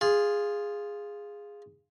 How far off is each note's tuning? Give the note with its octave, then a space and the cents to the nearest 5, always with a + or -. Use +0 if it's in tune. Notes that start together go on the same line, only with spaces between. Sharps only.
F4 +0 G#4 -10